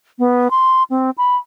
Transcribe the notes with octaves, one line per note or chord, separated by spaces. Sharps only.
B3
C6
C4
B5